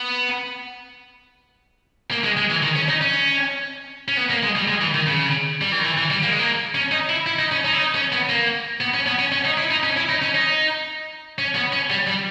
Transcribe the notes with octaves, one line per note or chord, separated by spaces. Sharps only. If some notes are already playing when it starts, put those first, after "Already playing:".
Already playing: B3
A#3
G#3
G#3
E3
D#3
C#4
D#4
C#4
C#4
B3
A#3
G#3
G3
G#3
E3
D#3
C#3
G3
E3
D#3
E3
E3
G3
A#3
G#3
A#3
C#4
D#4
E4
E4
D#4
C#4
D#4
E4
D#4
C#4
B3
A#3
B3
C#4
B3
C#4
C#4
D#4
E4
D#4
C#4
E4
D#4
C#4
D#4
C#4
B3
C#4
G3
G3